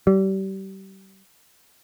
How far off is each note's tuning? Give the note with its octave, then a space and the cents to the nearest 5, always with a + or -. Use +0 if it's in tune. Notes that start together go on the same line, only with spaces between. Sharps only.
G3 -30